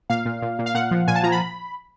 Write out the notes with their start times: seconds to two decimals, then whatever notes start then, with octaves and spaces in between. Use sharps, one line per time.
0.10 A#2 F5
0.25 A#2
0.42 A#2
0.59 A#2
0.66 F5
0.75 A#2 F#5
0.91 F3
1.08 A#2 G#5
1.15 A5
1.23 F3 A#5
1.32 B5